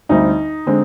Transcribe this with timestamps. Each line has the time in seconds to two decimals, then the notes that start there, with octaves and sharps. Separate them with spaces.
0.09 D2 D3 G3 C4 D#4
0.66 D3 G#3 C4